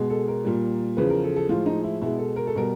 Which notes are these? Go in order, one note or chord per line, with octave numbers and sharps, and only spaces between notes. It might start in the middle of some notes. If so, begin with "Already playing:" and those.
Already playing: B2 G#3
A4
A#4
A#2 G3
E2 C#3 F3 B4
A#4
A4
A4
A2 F3 G#3 F4
D#4
E4
B2 G#3 E4
A4
A#4
A4
B2 G3 A#4